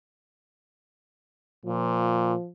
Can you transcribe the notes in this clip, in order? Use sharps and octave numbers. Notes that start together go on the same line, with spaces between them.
A#2 F3